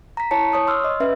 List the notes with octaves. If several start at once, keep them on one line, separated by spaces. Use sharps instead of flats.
A#5 B6
E4 C#5 A5 C#7
C#5 D#6
C6 E6 F6
D#5
C#4 B4 E5